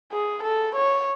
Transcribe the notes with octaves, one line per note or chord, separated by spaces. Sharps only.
G#4
A4
C#5